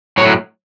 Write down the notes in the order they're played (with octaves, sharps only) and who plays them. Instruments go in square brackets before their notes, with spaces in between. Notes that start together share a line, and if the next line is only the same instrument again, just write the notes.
[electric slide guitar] A2 F#3 C#5